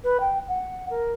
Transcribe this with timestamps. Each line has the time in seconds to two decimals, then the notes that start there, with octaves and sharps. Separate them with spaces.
0.04 B4
0.20 G5
0.48 F#5
0.90 A#4